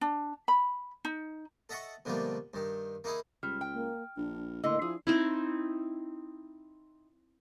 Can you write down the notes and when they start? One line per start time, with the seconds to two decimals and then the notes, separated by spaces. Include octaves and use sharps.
0.01 D4
0.48 B5
1.05 D#4
1.69 A4 D#5 E5 F#5 A5 C#6
2.05 B2 D3 F3 G3 A3 A#3
2.54 G2 D#3
3.04 A#3 D#4 E4 G#4
3.43 C#2 G3 F6
3.61 G5
3.73 A#3
4.17 A#1 D4
4.64 A2 D3 A#3 D#5 C6 E6
4.82 F3 E4 G#4
5.07 C4 D#4 E4